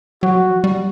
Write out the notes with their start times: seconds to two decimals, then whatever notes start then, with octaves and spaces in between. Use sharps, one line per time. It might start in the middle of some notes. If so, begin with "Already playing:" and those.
0.23 F#3 F#4
0.50 F3
0.57 F#3
0.64 G3